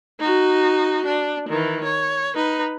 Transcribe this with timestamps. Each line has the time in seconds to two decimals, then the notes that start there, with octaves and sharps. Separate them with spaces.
0.20 D#4 F#4
1.06 D4
1.49 D#3 E3
1.83 C#5
2.35 D#4 B4